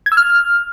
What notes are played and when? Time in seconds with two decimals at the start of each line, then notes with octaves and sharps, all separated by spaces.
0.06 G#6
0.12 E6
0.17 F6